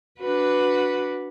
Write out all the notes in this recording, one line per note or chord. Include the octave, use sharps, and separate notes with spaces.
D4 F#4 B4